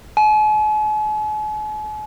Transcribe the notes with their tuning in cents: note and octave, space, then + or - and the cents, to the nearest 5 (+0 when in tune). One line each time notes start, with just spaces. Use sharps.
G#5 +45